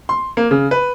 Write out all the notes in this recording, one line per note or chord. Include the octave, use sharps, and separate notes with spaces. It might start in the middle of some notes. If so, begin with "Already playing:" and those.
C6
A#3
C#3
B4